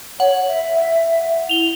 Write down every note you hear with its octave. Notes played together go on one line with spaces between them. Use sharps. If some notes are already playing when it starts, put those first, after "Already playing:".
C#5 F#5
E5
E4 F7 G7